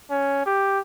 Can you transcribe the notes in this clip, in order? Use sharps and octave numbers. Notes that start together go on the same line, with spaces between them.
C#4
G4